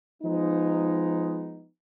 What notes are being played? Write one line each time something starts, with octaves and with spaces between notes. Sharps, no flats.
F3 G#3 B3 D#4